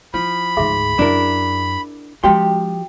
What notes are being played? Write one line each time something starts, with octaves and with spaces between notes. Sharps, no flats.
F3 E4 B5
D2 G#2 G#4 E5 C6
F#2 D4 E4 A#4
F3 G#3 C#4 F#4 G4 G5 C6